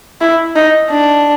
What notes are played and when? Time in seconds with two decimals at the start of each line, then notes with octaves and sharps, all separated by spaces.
0.21 E4
0.56 D#4
0.90 D4